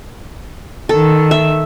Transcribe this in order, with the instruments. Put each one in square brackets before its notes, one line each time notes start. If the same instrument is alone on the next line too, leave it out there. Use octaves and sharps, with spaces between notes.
[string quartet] D#3 [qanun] A4
[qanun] E5